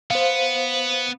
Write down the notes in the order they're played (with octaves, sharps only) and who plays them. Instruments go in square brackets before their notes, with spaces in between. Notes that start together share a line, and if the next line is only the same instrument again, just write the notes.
[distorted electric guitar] B3 [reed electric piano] C5 F5